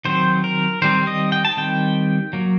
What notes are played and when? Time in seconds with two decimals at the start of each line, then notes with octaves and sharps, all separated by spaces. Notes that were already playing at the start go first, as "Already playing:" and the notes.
0.05 D#3 F#3 C4 C5
0.44 A#4
0.82 D#3 G3 C4 C5
1.07 D#5
1.32 G5
1.45 A5
1.57 D#3 G3 C4 G5
2.33 F#3 A#3